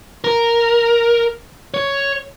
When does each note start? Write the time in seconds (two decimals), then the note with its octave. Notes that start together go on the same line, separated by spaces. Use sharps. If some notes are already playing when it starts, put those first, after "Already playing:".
0.24 A#4
1.74 C#5